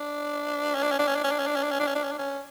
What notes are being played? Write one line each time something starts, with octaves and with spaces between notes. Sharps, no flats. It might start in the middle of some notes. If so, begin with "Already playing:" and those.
Already playing: D4
C#4
D4
C#4
D4
C#4
D4
C#4
D4
C#4
D4
C#4
D4
C#4
D4
C#4
D4
C#4
D4
C#4